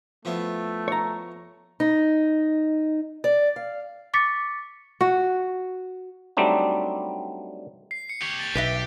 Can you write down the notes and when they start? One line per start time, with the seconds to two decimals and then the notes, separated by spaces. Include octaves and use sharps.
0.25 F3 A3 B3 E4
0.88 C#5 A#5
1.80 D#4
3.24 D5
3.56 F5
4.14 C#6 D6 A6 B6 C#7
5.01 F#4
6.37 F#3 G3 A3 C4 D4 D#4
7.91 C7
8.09 C#7
8.21 G4 C#5
8.39 A6
8.55 B1 G4 B4 D#5 E5